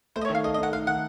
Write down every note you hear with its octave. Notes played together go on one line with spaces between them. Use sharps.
A3 C5
D#5
C#5
D#3
F5
A4 D#5
D#5
D#4 F#5
A3 F5
D#3 F#5